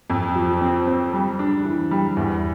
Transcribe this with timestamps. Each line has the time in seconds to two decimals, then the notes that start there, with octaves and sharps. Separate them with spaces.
0.10 F2
0.35 F3
0.61 C4
0.87 C4
1.13 G3
1.39 D4
1.65 E3
1.91 G3
2.17 E2